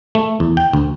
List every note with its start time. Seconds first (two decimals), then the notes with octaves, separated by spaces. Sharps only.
0.15 A3
0.40 E2
0.57 G5
0.73 D2